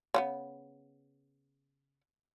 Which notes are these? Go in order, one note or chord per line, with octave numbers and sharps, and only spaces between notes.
C#3 F#3 B3